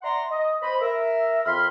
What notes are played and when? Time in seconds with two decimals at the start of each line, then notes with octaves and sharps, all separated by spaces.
0.02 D5 E5 F#5 A#5 C6
0.31 D#5
0.61 C5 D#5 B5
0.81 A#4 E5
1.45 F2 B5 C6 F6